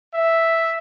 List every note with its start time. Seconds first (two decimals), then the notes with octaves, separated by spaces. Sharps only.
0.13 E5